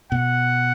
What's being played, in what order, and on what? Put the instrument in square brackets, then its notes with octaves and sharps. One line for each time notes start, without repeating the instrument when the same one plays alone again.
[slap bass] B2 [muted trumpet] F#5